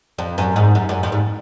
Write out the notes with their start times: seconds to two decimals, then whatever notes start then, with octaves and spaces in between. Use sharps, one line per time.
0.18 F2
0.38 F#2
0.56 G#2
0.75 F#2
0.89 F#2
1.03 F2
1.12 G#2